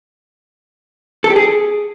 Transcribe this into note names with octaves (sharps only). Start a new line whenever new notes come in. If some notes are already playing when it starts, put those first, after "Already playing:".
A4
G4
G#4